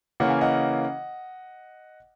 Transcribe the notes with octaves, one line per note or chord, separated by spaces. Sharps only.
C#3 E3 A#3 C#4 F#5
G#5
D#5 F#5